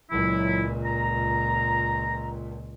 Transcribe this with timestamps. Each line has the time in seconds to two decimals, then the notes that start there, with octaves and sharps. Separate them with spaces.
0.11 C#2 A#2 F#3 E4
0.84 A#5